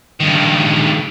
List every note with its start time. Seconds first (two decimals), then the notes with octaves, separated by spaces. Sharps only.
0.20 G2 D#3